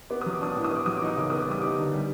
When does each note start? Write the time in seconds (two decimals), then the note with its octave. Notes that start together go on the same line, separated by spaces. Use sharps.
0.10 B3 D6
0.21 F#3 D#6
0.33 D6
0.41 D4 D#6
0.53 A2 D6
0.64 D#6
0.71 B3 D6
0.86 F#3 D#6
0.97 D#4 D6
1.08 D#6
1.17 C#3 D6
1.30 B3 D#6
1.40 D6
1.47 G3 D#6
1.62 D#4 D6
1.78 D3
1.93 G3